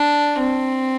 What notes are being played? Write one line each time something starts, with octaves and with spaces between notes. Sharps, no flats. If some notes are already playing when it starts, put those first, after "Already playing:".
Already playing: D4
C4